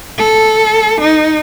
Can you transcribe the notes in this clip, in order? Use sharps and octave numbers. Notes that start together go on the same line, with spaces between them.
A4
D#4